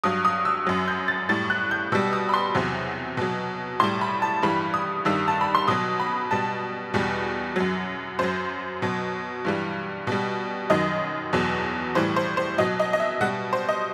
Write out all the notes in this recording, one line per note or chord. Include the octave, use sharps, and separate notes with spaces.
G2 F#3 D#6
D#6
E6
F#2 F#3
G6
A6
A2 G3 A6
F#6
G6
B2 G3 E6
D#6
B5
C6
E2 C3 F#3
B2 F#3
A2 G3 C6
B5
A5
G2 E3 G3 B5
D#6
G2 D#3 G3 E6
A5
B5
C6
B2 F#3 D#6
B5
B2 G3 A5
E2 B2 G3
F#2 F#3
F#2 F#3 C5
B2 F#3
G2 E3 G3
B2 G3
F#2 D#3 F#3 D#5
E2 B2 F#3
A2 E3 G3 C5
C5
C5
B2 F#3 D#5
D#5
D#5
E5
B2 G3 F#5
C5
D#5